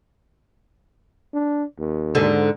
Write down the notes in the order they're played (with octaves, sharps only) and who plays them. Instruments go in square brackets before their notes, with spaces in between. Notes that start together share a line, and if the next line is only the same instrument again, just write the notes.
[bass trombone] D4
D#2
[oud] G#2 D3